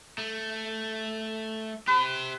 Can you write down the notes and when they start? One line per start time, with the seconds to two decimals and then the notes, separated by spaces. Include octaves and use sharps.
0.18 A3
1.87 G4 B4 C5